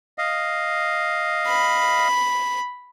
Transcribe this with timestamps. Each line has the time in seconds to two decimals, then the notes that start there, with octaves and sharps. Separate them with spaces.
0.18 D#5 F5
1.47 B5